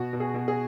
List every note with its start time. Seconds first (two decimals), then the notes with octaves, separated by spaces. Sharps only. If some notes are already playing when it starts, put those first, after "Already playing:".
Already playing: B2 F#4
0.13 B2
0.20 G#4
0.34 B2
0.48 G#4